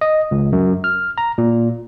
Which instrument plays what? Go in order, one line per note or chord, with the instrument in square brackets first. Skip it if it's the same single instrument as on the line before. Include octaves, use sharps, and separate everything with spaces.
[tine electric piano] D#5
C#2
F#2
F6
A#5
A#2